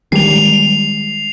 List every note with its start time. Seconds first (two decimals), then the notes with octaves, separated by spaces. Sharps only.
0.12 D#3 G3 G#3 C7 F7